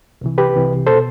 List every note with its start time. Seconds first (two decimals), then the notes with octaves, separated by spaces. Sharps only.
0.21 C2 C3 E3
0.38 G4 B4
0.54 C2 C3 E3
0.87 B2 A4 C5